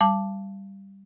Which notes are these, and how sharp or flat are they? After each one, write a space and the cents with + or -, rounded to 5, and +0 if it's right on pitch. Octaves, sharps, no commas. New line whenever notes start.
G3 +0 A5 +0 D6 +0